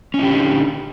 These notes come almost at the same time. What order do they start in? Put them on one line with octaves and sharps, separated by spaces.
C#4 E4 G4 D3 D#4